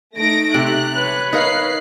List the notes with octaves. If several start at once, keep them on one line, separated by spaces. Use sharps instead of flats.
A3 D#4 A#6 D7
C3 A3 G4 F#6
B4 C#5
D#4 A#4 F5 F#6 C7